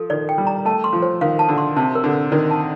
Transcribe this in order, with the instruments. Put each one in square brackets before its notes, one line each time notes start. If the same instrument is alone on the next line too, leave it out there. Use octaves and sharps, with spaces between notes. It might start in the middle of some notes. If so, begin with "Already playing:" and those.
Already playing: [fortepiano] F3 [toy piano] A4
[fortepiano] D#3 [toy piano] D5
[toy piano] G5
[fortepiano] G3
[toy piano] A#5
[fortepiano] A3 [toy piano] A5
[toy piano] C6
[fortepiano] F3
[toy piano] C5
[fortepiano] D#3 [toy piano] F5
[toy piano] A5
[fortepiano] D3
[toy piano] C6
[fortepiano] C3 [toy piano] A5
[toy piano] A#4
[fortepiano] D3
[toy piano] A#4
[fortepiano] D#3 [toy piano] D5
[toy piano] A5